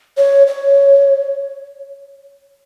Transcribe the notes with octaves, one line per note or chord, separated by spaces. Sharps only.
C#5
C#5